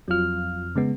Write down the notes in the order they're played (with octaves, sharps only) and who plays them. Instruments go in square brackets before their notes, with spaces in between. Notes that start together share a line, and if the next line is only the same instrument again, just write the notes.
[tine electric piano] F2 F6 [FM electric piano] F#3 F4
[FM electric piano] C#3 G#3 B3